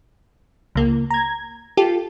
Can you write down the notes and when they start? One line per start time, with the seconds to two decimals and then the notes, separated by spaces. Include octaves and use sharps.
0.75 C#2 A#3
1.10 A#5 G#6
1.77 F4 G4 A4